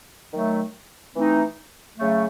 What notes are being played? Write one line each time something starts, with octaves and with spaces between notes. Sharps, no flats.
D#3 F#3 A3
E3 A3 C4 D#4
C#3 F#3 A3